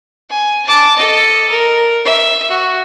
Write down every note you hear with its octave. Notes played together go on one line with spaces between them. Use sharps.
G#5
A5 D6
A4 D#5
A#4
E5
F#4